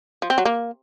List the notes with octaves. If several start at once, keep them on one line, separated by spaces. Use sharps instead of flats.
F3
C4
F#3
A#3